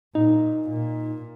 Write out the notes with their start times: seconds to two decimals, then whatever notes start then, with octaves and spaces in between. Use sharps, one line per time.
0.15 A#2 D#4
0.69 A#2